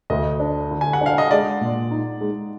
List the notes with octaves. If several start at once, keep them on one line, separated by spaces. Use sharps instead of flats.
D2 D#5
D4
D3
G#5
F#5
D4 F5
D#5
G#3 D5
A#2
D#4
G#3